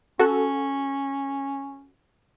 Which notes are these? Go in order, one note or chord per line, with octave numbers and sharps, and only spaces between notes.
C#4 F#4 A4